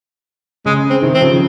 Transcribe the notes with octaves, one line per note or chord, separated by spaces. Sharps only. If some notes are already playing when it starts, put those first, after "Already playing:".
C#3 G#3
C4
C3 D#3
C4
C#3 F3